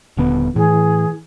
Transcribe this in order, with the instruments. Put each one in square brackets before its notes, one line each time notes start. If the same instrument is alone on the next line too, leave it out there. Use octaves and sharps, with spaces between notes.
[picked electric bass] D#1 D3 B3
[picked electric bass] A2 [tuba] E3 [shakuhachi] G#4